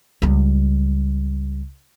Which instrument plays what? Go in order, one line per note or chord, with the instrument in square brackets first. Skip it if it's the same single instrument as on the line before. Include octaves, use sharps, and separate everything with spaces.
[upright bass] C#2 G3